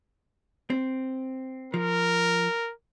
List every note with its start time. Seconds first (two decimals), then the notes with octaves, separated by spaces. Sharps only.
0.70 C4
1.74 F3 A#4